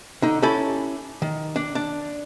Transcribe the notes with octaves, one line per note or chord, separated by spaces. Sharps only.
D3 D#4
C#4 E4 G4 A4 B5
D#3
D4
D4